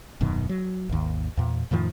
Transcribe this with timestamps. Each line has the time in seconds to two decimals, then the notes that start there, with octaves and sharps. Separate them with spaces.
0.21 D#1 F#2 B2 D#3
0.49 F#3
0.89 G#1 D#2
1.37 E2 A#2
1.71 F2 A2 D#3 F3